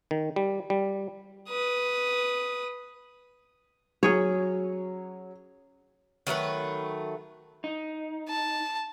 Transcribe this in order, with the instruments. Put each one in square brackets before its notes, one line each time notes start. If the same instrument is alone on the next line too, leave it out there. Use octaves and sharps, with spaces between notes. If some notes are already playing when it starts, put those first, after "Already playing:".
[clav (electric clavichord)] D#3
G3
G3
[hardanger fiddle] B4 D#6
[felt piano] F#3 [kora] C#4 G#4 C#5
[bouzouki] D#3 F#3 A3 B4
[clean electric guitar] D#4
[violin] A5